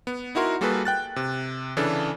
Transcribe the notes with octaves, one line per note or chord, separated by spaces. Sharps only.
B3
D#4 E4 F#4 A#4 C6
G3 A#3 F#4 G#4 A4 B4
G5 F#6 A6
C3
C#3 E3 D4 A4